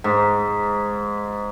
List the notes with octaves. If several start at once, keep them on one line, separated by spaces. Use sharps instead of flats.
G#2